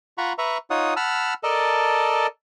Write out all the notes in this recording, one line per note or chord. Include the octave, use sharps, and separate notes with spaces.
F4 F#5 A#5 B5 C#6
B4 E5 A#5 C#6
D#4 F4 C#5 F#5 D#6
F#5 A5 B5 E6 F6
A4 A#4 D5 D#5 A5